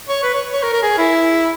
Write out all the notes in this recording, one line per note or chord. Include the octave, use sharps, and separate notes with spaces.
C#5
B4
C#5
C#5
A#4
A#4
G#4
E4